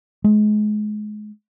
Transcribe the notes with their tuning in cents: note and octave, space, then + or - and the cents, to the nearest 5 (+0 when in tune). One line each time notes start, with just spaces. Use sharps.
G#3 +30